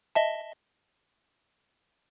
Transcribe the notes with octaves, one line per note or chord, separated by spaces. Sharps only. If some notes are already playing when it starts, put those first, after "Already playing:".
D#5 E5 A5